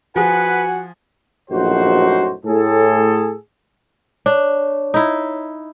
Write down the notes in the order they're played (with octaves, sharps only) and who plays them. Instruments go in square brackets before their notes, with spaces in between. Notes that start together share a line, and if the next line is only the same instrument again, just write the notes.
[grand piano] F3 G#4 [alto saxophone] F#4 [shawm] B4 [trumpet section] F#5 G#5
[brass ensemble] A#1 F#2 A2 D#4 F#4 C5
A2 G#4 A4
[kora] D4 [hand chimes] C#5
[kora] D#4 E4